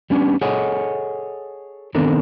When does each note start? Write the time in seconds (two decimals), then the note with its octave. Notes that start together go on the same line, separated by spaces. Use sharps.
0.10 G3 B3 C#4 D4
0.41 G#4 A4 C#5 D#5 F#5 G#5
1.95 D#3 B3 C4 D4 A4 A#4